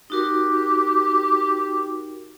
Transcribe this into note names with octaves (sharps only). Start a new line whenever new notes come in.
D#4 F#4 G4 A#4